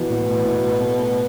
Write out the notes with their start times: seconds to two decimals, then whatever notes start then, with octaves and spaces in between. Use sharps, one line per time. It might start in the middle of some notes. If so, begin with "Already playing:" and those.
Already playing: B2 E3
0.10 A2
0.45 A2
0.81 A3